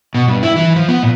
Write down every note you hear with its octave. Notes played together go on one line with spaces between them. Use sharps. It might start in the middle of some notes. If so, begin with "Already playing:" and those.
B2
G2
E4
E3
F3
B3
A#2